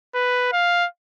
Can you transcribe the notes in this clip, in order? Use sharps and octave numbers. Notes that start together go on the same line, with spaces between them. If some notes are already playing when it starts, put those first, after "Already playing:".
B4
F5